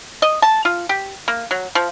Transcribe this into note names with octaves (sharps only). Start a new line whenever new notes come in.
D#5
A5
F4
G4
A#3
F#3
F3